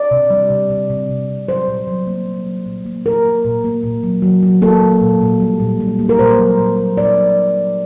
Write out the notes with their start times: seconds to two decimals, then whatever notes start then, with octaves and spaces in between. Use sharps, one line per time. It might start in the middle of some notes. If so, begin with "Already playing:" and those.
Already playing: D5
0.11 C3
0.30 G3
0.50 C3
0.70 C3
0.90 C3
1.09 C3
1.29 C3
1.48 F#3 C5
1.68 A#2
1.88 F#3
2.07 A#3
2.27 F#3
2.46 F#3
2.66 A#2
2.86 A#3
3.05 A#2 A#4
3.25 A#3
3.45 A#2
3.64 A#3
3.83 A#2
4.03 F#3
4.22 F#3
4.43 F#3
4.62 A#3 A4
4.82 A#3
5.01 A#2
5.21 A#2
5.40 G3
5.60 A#2
5.80 G3
5.99 A#3
6.09 A#4
6.19 A#2 C5
6.38 F#3
6.58 A#2
6.78 F#3
6.97 A#2 D5
7.17 F#3
7.37 A#2
7.56 F#3